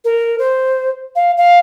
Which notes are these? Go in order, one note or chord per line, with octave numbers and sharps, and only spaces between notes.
A#4
C5
F5
F5